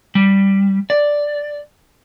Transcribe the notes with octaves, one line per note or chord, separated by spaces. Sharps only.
G3
D5